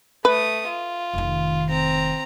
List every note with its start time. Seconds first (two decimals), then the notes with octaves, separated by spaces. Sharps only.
0.25 A3 B4 D#6
0.68 F4
1.14 F1 D#3
1.70 C4 A#5